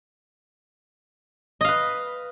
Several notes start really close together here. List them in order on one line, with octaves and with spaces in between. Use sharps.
D#5 F5 B4